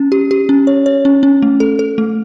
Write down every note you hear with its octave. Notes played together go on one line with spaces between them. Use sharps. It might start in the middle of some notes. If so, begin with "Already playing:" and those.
Already playing: C#4
G4
G4
C#4
C#5
C#5
C#4
C#4
A3
A4
A4
A3